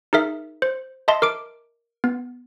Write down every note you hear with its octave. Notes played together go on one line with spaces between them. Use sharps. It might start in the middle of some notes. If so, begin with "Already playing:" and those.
D#4 G#4 A#4 E5
C5
D#5 E5 A5 C6
A#4 D6 D7
B3